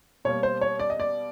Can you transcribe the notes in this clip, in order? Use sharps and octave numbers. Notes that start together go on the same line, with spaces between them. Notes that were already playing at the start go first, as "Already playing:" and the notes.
B2 G3 A#3 C#5
C5
C#5
D5
D#5
D5